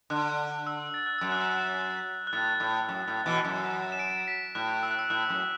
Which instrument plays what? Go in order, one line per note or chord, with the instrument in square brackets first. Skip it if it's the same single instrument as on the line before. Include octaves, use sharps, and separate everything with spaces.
[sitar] D3 [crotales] F#6
[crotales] E6
A6
F#6
[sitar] F#2 [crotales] E6
[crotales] F#6
F#6
[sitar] A2 [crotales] A6
[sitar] A2
F#2
A2
B2 E3
F#2
[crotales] E7
D7
B6
[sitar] A2 [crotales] F#6
[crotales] E6
F#6
E6
[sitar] A2 [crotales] F#6
[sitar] F#2